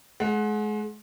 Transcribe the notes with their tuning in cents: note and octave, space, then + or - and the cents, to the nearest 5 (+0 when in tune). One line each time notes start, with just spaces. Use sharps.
G#3 +35 F#5 -20